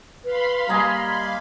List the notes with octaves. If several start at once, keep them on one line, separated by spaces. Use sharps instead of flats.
B4 F5 B5 C6
G3 A#3 D#5 G#5